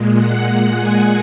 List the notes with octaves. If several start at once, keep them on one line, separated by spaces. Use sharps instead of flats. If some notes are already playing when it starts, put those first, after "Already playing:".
Already playing: A#2 G#3
F#5
A#2 G#3
G#5